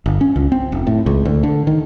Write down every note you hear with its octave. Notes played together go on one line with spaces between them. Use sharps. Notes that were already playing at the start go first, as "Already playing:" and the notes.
G1
C#4
C#2
C4
F1
A2
C#2
D2
D3
D#3